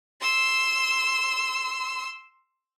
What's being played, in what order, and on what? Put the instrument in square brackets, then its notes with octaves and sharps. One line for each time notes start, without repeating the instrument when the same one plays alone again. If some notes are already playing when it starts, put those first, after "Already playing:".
[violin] C6 E6